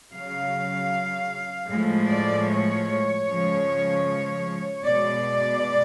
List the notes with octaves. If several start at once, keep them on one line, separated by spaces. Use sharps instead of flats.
C#3 F#3 F5
A2 F3 G#3
D5
C#5
C#3 F3 G#3
B2 G#3 D5